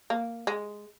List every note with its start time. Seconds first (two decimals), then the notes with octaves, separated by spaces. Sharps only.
0.10 A#3
0.47 G#3